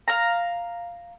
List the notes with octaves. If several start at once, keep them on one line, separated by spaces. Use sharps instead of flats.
F5 A#5